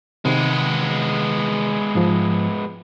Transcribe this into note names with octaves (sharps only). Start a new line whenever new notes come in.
C3 D#3 G#3 B3
G#2 F3